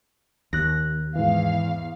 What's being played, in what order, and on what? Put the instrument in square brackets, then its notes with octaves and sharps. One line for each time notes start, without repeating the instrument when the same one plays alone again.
[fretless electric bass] D#2 [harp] F#6 A#6
[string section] E2 F5 [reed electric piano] G#2 E3